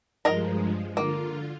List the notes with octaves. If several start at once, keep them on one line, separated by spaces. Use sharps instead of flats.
G2 F3 G#3 A#4 D#5 A#5
D3 A#3 F4